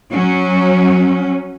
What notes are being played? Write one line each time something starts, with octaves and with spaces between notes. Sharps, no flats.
F#3 C#4